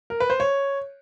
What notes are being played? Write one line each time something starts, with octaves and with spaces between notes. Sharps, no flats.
A#4
B4
C5
C#5